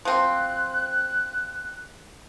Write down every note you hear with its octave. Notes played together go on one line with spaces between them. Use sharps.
F3 C4 F#6